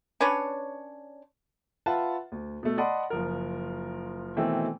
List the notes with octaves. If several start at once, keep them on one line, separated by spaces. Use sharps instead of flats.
C#4 D4 B4 C#5
F4 B4 E5 F#5 A5
D2
B2 A3
D5 D#5 F#5 A5 B5 C6
F#1 F3 A#4
B2 D#3 E3 A3 C4